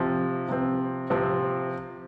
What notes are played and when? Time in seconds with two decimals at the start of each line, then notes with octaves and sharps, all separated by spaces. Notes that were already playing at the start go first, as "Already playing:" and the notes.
Already playing: C3 F3 C4
0.48 C3 F3 C4
1.10 C3 F3 C4